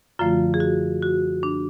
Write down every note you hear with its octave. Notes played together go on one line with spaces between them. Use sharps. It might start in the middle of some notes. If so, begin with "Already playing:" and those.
F#2 D3 F3 A3 F4
G#4
F#4
F#4
D4